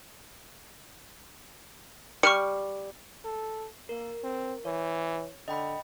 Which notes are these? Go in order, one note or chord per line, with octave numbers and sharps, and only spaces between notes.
G3 C#6 F6 C#7
A4
A#3 A#4
C4
E3 C#5
D3 D#5 G5 B5